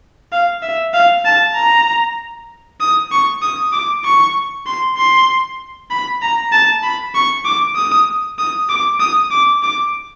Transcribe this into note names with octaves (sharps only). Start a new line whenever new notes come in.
F5
E5
F5
A5
A#5
D#6
C#6
D#6
D6
C#6
C6
C6
B5
A#5
A5
B5
C#6
D6
D#6
D#6
D6
D#6
D6
D6